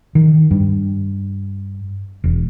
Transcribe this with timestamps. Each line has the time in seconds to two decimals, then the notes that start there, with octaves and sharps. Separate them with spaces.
0.15 D#3
0.51 G2
2.24 E1